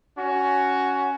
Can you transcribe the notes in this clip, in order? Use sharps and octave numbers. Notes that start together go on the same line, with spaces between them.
C#4 F#4